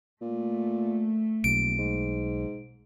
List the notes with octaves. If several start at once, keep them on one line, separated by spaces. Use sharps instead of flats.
A#2 A3
D#1 B1 D7
G#2